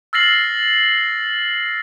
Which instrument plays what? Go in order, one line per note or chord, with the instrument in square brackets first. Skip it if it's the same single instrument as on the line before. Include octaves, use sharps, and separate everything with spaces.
[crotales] E6 F6 A6 A#6 C7 F#7